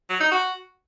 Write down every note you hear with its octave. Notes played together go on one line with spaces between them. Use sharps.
F#3
D#4
F#4